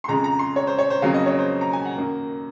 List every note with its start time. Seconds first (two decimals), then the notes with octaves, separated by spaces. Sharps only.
0.04 C6
0.08 F2 C#3 G#3 A#5
0.24 A#5
0.39 C6
0.56 C#5
0.67 C5
0.79 C#5
0.90 C5
1.02 F2 C#3 F#3 A#3 F5
1.14 D#5
1.26 C#5
1.39 C5
1.61 A#5
1.73 G#5
1.85 F#5
1.97 F#2 D#3 A#3